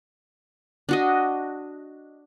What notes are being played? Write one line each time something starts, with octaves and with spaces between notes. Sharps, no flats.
D4 F#4 D#5